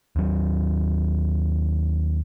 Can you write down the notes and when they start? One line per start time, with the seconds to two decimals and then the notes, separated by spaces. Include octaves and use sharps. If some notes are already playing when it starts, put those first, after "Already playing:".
0.16 D#2 F#3